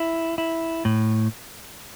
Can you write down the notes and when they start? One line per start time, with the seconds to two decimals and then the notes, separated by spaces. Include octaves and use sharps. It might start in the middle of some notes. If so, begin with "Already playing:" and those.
Already playing: E4
0.38 E4
0.85 A2